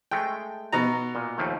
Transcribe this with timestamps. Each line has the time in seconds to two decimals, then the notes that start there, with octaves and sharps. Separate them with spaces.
0.11 G#3 A3 G5
0.73 B2 D#4 A#5
1.15 A#2
1.38 D#2 F3 A3